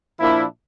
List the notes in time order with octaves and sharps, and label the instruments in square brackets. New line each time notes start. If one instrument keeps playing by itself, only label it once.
[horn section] A#2 F3 A#3 D4 E4